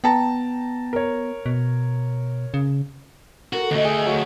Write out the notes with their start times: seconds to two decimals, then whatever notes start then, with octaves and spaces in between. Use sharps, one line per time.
0.04 B3 G5 A5 A#5
0.93 A#4 C#5
1.46 B2
2.54 C#3
3.53 F#4 A4 A#4
3.71 D2 A3 D#5
3.85 G#4
4.02 F#3 F5